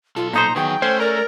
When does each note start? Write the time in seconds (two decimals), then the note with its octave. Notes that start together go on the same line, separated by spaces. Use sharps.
0.16 B1 F4 A4
0.33 A#2 D#4 C5 A#5
0.56 D#3 F#3 B3 G#4 G5
0.82 A3 C#4 C5
1.00 A#4 D5